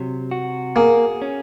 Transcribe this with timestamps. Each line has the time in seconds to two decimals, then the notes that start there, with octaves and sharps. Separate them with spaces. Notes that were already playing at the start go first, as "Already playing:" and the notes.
Already playing: C3 F#3
0.31 F#4
0.76 A#3 G#4
1.22 C#4